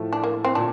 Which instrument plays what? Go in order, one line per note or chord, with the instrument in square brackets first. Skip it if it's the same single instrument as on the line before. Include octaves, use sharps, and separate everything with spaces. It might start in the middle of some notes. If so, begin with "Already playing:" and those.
Already playing: [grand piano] A2 F3 A3
[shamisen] D4
A#3
C4
[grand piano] A#2 [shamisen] D4